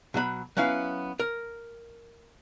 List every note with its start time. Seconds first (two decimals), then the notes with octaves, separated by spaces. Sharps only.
0.14 B2 F#3 D#5 B5
0.57 F#3 B3 C#4 E4 F5
1.20 A#4